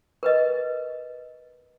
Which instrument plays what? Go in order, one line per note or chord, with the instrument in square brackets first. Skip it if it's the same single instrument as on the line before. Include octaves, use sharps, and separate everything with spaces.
[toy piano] A#4 B4 D#5